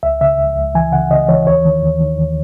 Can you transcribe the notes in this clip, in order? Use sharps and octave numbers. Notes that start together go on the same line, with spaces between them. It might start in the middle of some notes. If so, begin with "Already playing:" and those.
C#2 E5
C#3 E5
C#2
C#2
E3 G#5
C#3 F#5
C#3 D#5
E3 C#5
D#2 C#5
D#3
D#2
D#3
D#2